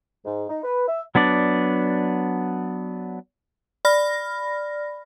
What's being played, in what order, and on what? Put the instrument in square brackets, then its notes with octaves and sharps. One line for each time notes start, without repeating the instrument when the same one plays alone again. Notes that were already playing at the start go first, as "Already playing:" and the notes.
[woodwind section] G#2
D#4
B4
E5
[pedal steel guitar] F#3 B3 D4 D5
[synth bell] D5 B5 F6 A#6